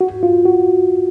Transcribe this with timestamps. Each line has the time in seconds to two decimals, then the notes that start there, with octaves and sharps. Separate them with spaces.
0.01 F#4
0.23 F4
0.45 F#4